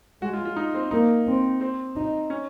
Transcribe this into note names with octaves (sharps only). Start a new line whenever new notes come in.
G#3 F#4
F4
F4
D#4
C4
A#3 D#4
C4
C4
D#4
C#4